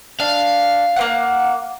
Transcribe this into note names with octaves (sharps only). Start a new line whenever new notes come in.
D4 F5
A#3 C4 F#5